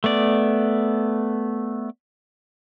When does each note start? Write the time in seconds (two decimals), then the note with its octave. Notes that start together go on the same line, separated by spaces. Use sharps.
0.04 A3 B3 D5